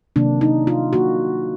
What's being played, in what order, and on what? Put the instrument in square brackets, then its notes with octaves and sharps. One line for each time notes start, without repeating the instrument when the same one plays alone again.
[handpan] C3 D#3 F#3 A#3 D4
D#4
F4
C3 D#3 F#3 A#3 F#4